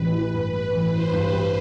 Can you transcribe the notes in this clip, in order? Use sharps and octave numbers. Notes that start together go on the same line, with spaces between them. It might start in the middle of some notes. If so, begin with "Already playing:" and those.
Already playing: A1 G3 B4
E3
G2
G3 B4
A1
E3 C5
G2
G3